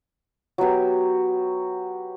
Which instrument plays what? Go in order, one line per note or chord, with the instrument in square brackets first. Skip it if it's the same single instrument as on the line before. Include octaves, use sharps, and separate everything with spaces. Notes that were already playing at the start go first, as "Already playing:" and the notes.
[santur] F#3 B3 F#4 G4